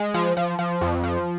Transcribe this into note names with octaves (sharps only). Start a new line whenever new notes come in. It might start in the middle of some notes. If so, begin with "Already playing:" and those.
Already playing: G#3
F3
F3
F3
F2
F3